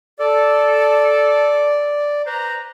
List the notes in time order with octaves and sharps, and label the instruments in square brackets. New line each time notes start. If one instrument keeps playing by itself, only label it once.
[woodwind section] A4 [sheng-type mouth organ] D5
[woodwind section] B4 C5 A#5